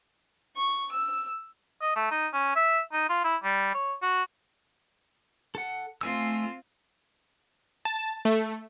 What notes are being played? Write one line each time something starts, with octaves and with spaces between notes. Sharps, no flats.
C#6
E6
D#5
A3
D#4
C#4
E5
D#4
F4
E4
G3
C#5
F#4
A4 F#5
A3 C4 F4 G#5 E6
A5
A3